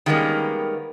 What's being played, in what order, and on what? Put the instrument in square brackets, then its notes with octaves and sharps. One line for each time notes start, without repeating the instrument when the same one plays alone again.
[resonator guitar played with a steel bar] D#3 G3 G#3 A#3 B3 C#4